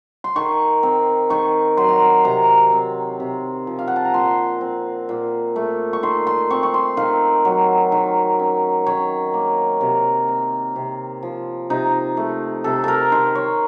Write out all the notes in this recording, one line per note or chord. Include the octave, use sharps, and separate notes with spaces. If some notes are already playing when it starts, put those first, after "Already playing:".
C6
D#3 C#6
C4
D#3 C#6
F#3 C6
A#5
C6
C3 A#5
C4
C3
F3
F5
F#5
A5
A#5
A#2 C6
C4
A#2
A3
C#6
D#3 C6
C6
C4 C#6
C#6
C6
D#3 F5
F#3
D#3
C#4
D#3 C#5
A#3
C3 A#4
C4
C3
F3
C3 D#4
A3
C3 A4
A4 A#4
D#3 C5
C#5